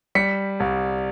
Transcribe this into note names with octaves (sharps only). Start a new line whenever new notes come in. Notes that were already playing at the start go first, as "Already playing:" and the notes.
G3 B6 C#7
C2